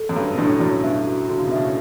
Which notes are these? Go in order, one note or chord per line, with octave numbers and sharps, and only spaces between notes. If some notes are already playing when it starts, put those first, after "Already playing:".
Already playing: A4
F#2
G2 A4
B2
F#2 A2 D4
F#2 A2 F#4
G2 B2 E5
F#4
D3 F#4
C#3
B2
A2 C#3 E5